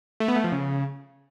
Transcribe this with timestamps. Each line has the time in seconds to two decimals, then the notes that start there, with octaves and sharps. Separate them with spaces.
0.20 A3
0.28 B3
0.36 A3
0.44 F3
0.52 C#3